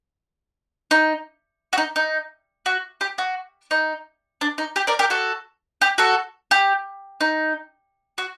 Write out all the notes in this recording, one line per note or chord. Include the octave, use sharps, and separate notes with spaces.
D#4
F#4
D#4
D#4
F#4
G4
F#4
D#4
D4
D#4
G4
A#4 D5
G4 A#4
F#4 A4
G4
F#4 A4
G4
D#4
F#4